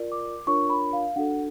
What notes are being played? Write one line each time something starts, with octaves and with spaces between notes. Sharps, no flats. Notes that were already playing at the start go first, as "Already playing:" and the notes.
Already playing: F4 A#4 D5
D6
D4 F4 A#4 C#5 C#6
B5
F5
D4 F#4 A4 F#5